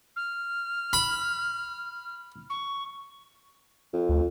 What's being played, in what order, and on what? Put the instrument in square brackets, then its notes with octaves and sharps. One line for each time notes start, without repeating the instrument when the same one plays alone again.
[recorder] F6
[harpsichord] B5
[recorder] C#6
[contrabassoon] F2
[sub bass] D2